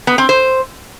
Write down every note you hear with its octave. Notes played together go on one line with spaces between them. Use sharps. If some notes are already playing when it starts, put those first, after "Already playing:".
B3
C4
C5